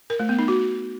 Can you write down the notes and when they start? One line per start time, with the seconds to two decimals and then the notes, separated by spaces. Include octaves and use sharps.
0.10 A#4
0.20 A3
0.29 B3
0.39 D#4
0.48 F#4